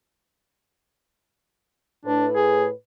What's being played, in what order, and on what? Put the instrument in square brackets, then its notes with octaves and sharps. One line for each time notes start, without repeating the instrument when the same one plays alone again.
[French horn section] A2 B4 [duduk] D4
[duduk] G#4